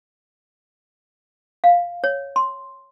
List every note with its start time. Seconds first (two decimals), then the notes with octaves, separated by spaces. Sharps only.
1.64 F5
2.04 C#5
2.36 C6